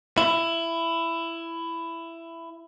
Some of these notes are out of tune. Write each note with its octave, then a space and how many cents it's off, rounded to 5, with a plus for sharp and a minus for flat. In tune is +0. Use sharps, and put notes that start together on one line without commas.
E4 +15